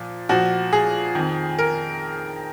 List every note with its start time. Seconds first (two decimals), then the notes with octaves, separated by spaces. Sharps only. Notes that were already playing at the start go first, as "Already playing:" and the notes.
Already playing: A#2 F3
0.29 A#2 F3 F#4
0.73 G#4
1.15 F2 D#3
1.59 A#4